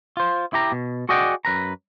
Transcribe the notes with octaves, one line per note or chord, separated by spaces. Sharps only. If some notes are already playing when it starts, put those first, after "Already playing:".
F4 C5
E4 G4 A#5
B2
F#4 G#4 D5 D#5 F#5 G5
F#2 B4 A#5